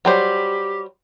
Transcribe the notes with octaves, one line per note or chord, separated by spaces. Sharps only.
F#3 G3 G4 C5